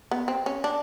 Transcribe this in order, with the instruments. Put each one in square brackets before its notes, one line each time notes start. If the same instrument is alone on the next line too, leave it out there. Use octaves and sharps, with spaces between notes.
[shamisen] B3
C4
C#4
D4